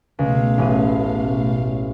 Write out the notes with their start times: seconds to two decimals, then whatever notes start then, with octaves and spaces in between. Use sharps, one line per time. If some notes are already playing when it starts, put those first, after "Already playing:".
0.19 C#2 B2 A3 F5
0.58 A1 D#7